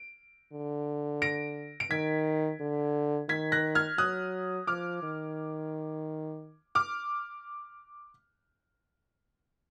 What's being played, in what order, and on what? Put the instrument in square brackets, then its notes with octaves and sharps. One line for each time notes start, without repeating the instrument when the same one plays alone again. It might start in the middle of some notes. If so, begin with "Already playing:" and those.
Already playing: [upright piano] D7
[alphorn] D3
[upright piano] A#6 D7
D7
[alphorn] D#3 [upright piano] G#6 B6
[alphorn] D3
[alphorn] D#3 [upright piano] G#6 B6
[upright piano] F#6 A#6
F6 G#6
[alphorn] F#3 [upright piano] D#6 F#6
[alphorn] F3 [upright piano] D6 F6
[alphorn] D#3
[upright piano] D6 F6